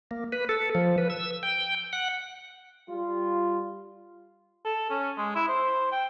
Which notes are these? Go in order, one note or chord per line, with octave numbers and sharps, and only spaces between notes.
A#3
B4
A4
F3
B4
E6
G5
F#5
G3 F4
A4
C#4
G#3
E4
C5
G5